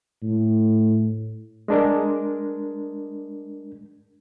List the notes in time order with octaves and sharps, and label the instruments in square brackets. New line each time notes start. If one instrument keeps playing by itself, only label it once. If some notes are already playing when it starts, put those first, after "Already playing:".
[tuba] A2
[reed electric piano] G#3 D4 A#4